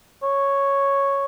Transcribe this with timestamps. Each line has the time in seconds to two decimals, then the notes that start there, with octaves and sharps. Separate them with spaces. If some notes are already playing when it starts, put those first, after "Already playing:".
0.23 C#5